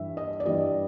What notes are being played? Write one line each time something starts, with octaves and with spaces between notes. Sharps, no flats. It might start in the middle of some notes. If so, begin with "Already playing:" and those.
Already playing: G2 E3 G3 E5
D#5
D5
G2 E3 G3 D#5